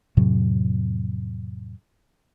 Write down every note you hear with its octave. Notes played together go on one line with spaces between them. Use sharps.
F2 A2 C3 F#3